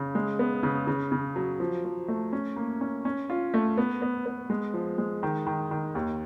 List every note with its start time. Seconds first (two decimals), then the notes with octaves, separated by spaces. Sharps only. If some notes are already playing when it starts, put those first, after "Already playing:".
Already playing: C#3
0.15 G#3
0.39 B3
0.63 C#3
0.87 C#3
1.12 C#3
1.36 F#3
1.60 F3
1.85 F3
2.08 A3
2.33 C#4
2.56 A#3
2.81 C#4
3.05 C#4
3.30 F4
3.54 A3
3.78 B3
4.02 B3
4.26 B3
4.50 G#3
4.74 F3
4.98 G#3
5.23 D#3
5.47 D#3
5.71 D#3
5.95 D#2